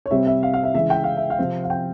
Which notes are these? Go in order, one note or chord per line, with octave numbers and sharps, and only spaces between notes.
C#5
C3 G3 C4 E5
E5
F5
F5
E5
C#3 E3 G#3 E5
G5
F5
E5
F5
C3 F3 C4
F5
G5